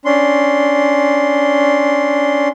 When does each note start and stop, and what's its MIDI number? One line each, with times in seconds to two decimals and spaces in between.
0.05 2.48 61
0.05 2.48 62
0.05 2.48 84